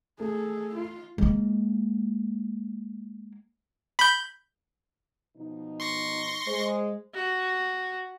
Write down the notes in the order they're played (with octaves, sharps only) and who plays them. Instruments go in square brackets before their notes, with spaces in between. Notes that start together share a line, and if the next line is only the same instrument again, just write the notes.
[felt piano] A3 [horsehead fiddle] G#4 A4
[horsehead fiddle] F4
[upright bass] G#3 A#3
[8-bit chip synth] B5 G6
[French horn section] B2 F3 D#4
[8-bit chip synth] C6 C#6 A#6
[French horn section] G#3 [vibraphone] C5
[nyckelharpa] F#4